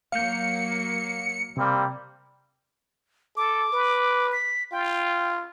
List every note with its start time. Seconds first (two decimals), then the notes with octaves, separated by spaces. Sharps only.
0.12 F#3 A#3 F5 G6 C#7
1.57 C3 G3 A#3 C4
3.37 A4 D6
3.73 B4
4.32 B6
4.72 F4 G5